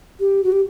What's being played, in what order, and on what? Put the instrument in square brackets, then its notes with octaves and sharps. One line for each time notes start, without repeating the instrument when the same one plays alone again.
[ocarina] G4
F#4
G4